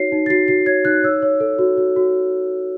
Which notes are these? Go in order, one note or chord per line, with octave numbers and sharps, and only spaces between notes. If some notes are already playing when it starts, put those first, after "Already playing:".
Already playing: D#4 F#4 C#5 C7
D#4
A6
F#4 C7
F#4 C7
C#5 G#6
D#4 F#6
C#5 E6
C#5
A4
F#4
F#4
F#4